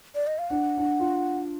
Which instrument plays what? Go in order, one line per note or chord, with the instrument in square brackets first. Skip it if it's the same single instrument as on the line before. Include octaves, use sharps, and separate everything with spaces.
[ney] D5
D#5
F5
[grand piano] D4 [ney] F#5
[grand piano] D4
F4